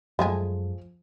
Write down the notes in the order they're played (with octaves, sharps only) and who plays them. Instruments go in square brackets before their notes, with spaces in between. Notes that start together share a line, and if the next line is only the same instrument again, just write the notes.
[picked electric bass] F#2 F#3 [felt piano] F3 [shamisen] G#3 A3 G#4